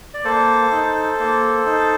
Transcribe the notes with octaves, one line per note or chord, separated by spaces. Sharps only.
D5
A#3 A4 C5
D#4
A#3
D#4